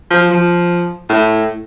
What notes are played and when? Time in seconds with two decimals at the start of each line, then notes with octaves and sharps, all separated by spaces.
0.11 F3
0.30 F3
1.09 A2